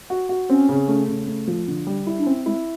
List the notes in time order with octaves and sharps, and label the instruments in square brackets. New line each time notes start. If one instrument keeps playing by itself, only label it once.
[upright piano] F#4
F#4
[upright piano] C4 [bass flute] C#4
[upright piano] C#3
A3
C#3
A3
F3
D3
G3
E4
[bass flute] D4
[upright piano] C4 [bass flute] C#4
[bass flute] G#3 [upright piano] E4